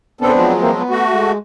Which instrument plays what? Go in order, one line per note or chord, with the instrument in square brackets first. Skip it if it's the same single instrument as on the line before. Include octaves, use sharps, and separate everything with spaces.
[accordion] A#2 C#3 A4 [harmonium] B3 C4 D4
[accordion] F3 F#3 G#3
[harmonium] E3 A#3 C4
B3
[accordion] A3 F#4
[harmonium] G#3